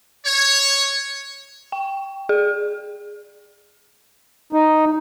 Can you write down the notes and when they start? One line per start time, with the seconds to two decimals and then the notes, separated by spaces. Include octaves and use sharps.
0.24 C#5
1.72 G5
2.29 G#4
4.53 D#4